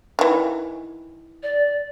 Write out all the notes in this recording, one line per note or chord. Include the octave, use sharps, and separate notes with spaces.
D#3 E3
D5